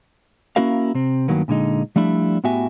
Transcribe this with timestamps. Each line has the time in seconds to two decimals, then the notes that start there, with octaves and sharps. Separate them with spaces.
0.56 A#3 C#4 E4 F#4 A#4 F5
0.95 C3 C4
1.28 G2 D#3 F#3 A#3 B3
1.48 A#2 D3 G#3 D#4
1.96 F3 G3 A3 D4 E4
2.44 A2 B3 F#4 G4 E5 G#5